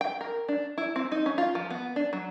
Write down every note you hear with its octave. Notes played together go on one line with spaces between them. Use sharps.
G5
A#4
D4
E4
C4
D#4
C#4
F4
F3
B3
D4
F#3